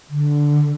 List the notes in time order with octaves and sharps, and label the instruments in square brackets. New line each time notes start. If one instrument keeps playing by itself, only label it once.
[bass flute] D3